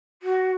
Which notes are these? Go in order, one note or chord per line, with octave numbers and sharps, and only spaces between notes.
F#4